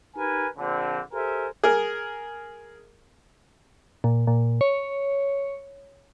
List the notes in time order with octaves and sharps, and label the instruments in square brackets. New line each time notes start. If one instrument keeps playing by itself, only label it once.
[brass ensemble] D#4 G4 A#4 B4 G#5
A#1 D3 C4
G4 A4 A#4 C5 E5 G#5
[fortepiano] G#4 A#4
[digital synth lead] A#2
A#2
C#5